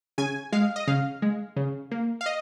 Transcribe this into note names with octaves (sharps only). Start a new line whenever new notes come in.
C#3 G#5
G#3 F5
D#5
C#3 F5
G#3
C#3
A#3
F5
D#5